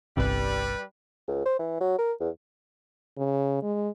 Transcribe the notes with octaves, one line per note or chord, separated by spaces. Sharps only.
G1 C2 C3 G3 B4
C#2
C5
E3
F#3
A#4
E2
C#3
G#3